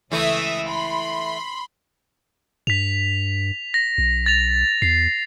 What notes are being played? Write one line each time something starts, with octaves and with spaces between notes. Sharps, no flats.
C#2 E3 A3 E4 E5 D#6
B5 C6
G2 B6 F7
A#6
B1
A6 F7
E2 C7